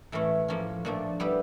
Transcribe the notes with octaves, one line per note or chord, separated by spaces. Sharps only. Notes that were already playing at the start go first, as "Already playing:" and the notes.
A2 E3 A3 C#4
A2 F3 A#3 C#4
A#2 F3 A3 D4
G3 B3 E4 G4 B4